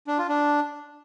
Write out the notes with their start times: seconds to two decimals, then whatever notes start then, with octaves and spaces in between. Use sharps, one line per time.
0.07 D4
0.18 F4
0.29 D4